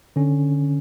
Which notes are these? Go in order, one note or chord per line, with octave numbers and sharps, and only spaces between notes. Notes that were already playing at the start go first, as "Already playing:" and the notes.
D3 C#4